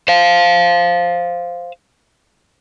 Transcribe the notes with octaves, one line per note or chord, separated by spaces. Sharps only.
C5 F5